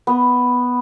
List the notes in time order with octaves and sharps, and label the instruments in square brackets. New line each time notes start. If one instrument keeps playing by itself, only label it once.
[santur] B3